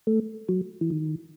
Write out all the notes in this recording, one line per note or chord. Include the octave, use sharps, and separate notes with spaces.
A3
F#3
E3
D#3